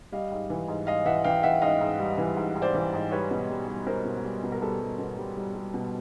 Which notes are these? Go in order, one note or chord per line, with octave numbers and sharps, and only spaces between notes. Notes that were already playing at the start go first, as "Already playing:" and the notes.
G3 D#5 F5
G#2
E3
G#2
G#2 D#5 F5
E3 E5 F#5
E3 F5 G5
E3 E5 F#5
G#2 D#5 F5
G#2
G3
E3
G#2
G#2
C5 D5
E3
G#2
G3 B4 C#5
B2
G3
G3
B2 A#4 C5
B2
G3
B2
A#4
G3 A4 B4
G3
B2
G3
G3
G3
B2